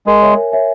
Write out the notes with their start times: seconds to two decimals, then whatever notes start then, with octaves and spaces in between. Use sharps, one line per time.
0.06 G#3 A#4
0.22 C#5 E5 G#5
0.37 A#4
0.52 C#5 E5 G#5